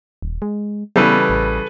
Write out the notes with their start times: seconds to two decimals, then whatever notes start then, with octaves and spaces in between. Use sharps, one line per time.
0.22 D#1
0.42 G#3
0.96 C#3 E3 G3 B3 A4 B4
1.30 A1